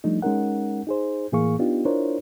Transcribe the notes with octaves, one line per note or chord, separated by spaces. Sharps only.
F3 G3 A3 D4 D#4
G#3 C#4 D#4 A#4 F#5
D#4 G#4 C5
A2 E3 A#3 G#4 F5 C#6
B3 D4 D#4 F4 G4
D4 E4 F4 A#4 C5 C#5